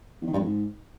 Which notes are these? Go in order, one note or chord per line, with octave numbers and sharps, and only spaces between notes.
E2
D#3
G2
F2
G#2